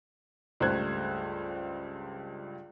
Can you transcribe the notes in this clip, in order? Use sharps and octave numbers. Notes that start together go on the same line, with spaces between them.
C#2 G2 A3 C5 F#6 G#6